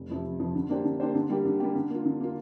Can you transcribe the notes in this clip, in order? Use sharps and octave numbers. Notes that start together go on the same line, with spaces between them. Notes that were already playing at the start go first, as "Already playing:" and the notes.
Already playing: F1
F2 C3 F3
F1
F2 C3 F3
D3
A#3 D4 G4 C5
D3
A#3 D4 G4 C5
D3
G3 A#3 G4
D3
G3 A#3 G4
D3
A#3 F4
D3
A#3 F4